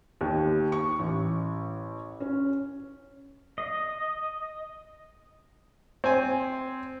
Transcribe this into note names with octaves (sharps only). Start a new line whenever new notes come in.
D#2
C#6
A1
C#4
D#5
C4 G#5